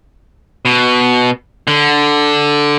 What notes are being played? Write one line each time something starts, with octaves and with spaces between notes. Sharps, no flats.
B2
D3